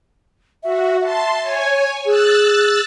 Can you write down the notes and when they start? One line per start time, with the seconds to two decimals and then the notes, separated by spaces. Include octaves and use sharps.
0.63 F#4 E5
1.01 E5 A5 C6
1.41 C#5 G#5
2.05 G#4 E6 F#6 A6